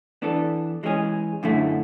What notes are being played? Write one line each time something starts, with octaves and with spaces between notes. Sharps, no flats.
E3 B3 D4 A4
E3 G#3 C#4 G#4
F#2 D3 A3 E4